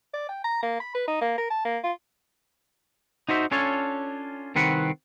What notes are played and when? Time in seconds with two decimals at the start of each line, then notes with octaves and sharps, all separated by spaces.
0.14 D5
0.29 G5
0.44 A#5
0.63 A#3
0.80 B5
0.94 B4
1.07 D#4
1.21 A#3
1.38 A#4
1.50 A5
1.65 A#3
1.83 F4
3.29 D#4 F#4 C5 E5
3.51 C#4 D4 F4 A4 C#5
4.55 C2 D#3 C4 B4 F#5